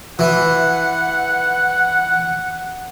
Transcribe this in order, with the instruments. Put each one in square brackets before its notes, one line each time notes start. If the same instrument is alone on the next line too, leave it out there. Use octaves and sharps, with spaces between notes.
[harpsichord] E3 [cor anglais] F#5